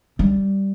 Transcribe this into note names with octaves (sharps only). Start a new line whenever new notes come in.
G3